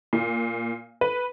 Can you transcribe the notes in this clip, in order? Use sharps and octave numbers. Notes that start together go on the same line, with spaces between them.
A#2
B4